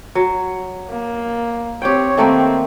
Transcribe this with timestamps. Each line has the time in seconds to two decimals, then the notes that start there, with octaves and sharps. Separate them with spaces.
0.15 F#3
0.90 A#3
1.82 C4 G4 C#5 G5
2.17 D#3 A3 A#3 C4